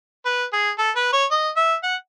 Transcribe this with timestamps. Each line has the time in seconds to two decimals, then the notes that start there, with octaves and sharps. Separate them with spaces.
0.26 B4
0.53 G#4
0.79 A4
0.96 B4
1.13 C#5
1.31 D#5
1.57 E5
1.83 F#5